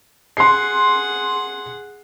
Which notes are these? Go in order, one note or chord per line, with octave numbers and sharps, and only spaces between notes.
G#4 F#5 C6 C7